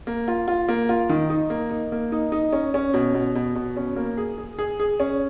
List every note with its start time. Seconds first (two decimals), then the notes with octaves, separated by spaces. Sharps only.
0.07 A#3
0.28 F4
0.48 F4
0.68 A#3
0.89 F4
1.09 D#3
1.30 D#4
1.50 A#3
1.71 D#4
1.92 A#3
2.12 D#4
2.32 D#4
2.53 C#4
2.74 C#4
2.94 B2
3.14 B2
3.35 B2
3.55 B2
3.77 C#4
3.96 A#3
4.17 G#4
4.38 G#4
4.59 G#4
4.80 G#4
5.00 C#4